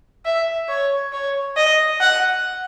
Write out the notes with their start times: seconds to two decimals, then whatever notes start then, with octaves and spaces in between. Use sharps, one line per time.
0.25 E5
0.69 C#5
1.12 C#5
1.56 D#5
2.01 F#5